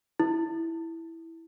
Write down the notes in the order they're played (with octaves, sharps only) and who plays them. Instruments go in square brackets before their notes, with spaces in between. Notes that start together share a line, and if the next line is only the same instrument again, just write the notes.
[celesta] E4